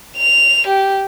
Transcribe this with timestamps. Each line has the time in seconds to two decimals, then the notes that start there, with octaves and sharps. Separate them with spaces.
0.17 F7
0.67 G4